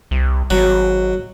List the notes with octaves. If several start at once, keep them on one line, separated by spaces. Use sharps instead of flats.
C2
G#1 F#3